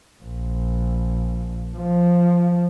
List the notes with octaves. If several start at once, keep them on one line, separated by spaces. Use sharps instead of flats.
A#1
F3